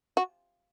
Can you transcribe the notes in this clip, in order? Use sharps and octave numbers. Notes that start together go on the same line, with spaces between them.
F#4